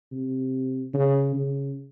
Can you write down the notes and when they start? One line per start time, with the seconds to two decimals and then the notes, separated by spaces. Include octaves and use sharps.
0.12 C3
0.94 C#3
1.35 C#3